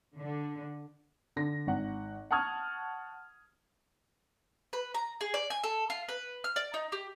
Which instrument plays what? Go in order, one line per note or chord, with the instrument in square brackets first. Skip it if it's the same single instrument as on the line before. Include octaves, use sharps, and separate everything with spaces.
[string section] D3
[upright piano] D3 A#6
G#1 F#5
F#5 A5 C#6 D#6 F6 G#6
[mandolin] B4
A#5
G#4
D5
G#5
A4
F4
B4
F6
D5
D#4
G4